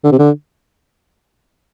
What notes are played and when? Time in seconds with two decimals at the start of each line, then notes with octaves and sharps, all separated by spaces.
0.04 D3
0.12 C3
0.19 D3